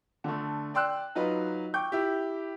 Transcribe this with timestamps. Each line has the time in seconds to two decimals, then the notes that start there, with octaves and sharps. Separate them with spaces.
0.24 D3 A3
0.74 D5 G5 C6 E6 F#6
1.15 F#3 D#4 F4 B4
1.74 G5 C#6 D6 G6
1.92 E4 G4